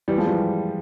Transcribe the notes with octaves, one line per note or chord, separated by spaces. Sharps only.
E3 G3
F3 G#3
E3 G3